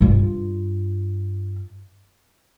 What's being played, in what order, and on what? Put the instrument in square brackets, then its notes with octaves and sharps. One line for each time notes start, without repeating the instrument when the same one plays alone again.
[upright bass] G2 F4